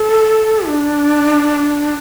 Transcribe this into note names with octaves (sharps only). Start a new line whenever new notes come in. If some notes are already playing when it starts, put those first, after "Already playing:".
Already playing: A4
D4